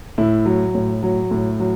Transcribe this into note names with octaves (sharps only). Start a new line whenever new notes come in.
A2 E4
F#3
A2
F#3
A2
F#3